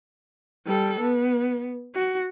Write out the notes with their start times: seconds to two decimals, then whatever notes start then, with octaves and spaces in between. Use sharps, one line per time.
0.66 G3 A4
1.00 B3
1.95 F#4